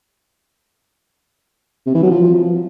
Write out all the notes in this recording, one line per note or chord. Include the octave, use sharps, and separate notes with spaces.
C3
E3
F#3
F3